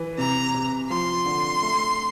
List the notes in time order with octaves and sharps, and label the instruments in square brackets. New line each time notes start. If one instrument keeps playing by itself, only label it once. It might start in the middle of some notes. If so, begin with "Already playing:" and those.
Already playing: [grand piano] E3
[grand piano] C3 [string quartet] A#5
[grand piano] C3
[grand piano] F3 [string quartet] C6
[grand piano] D3
A3